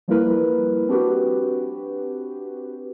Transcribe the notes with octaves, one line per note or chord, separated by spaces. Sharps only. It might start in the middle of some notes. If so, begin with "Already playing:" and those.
F3 G3 A#3 E4 A#4 B4
C4 D4 F#4 G4 B4